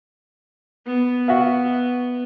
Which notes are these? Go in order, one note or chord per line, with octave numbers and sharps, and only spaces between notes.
B3
F#4 E5 F5